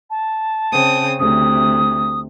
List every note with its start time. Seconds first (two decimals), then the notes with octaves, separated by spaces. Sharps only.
0.10 A5
0.72 C#3 C4 D#6
1.19 D2 C3 D#6